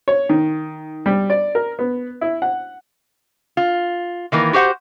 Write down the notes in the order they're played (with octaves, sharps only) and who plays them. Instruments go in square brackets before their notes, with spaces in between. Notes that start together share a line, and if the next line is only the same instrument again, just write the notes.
[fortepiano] C#5
D#3
G3
D5
A#4
B3
E4
F#5
[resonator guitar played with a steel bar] F4
D#3 E3 A#3
F#4 G4 C5 F#5